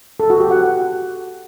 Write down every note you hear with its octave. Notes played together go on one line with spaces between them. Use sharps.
A4
F#4
G4
F#5
F#4